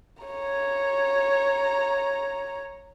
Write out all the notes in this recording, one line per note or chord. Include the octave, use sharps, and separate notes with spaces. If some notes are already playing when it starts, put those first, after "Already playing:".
C#5 A#5